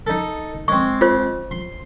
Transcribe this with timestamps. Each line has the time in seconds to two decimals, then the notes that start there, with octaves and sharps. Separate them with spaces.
0.07 D#4 A4
0.68 G#3 C4 C#6
1.01 F4 C5
1.51 C6